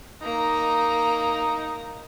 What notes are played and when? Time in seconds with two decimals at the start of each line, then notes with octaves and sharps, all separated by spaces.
0.22 A#3 D#4 A#5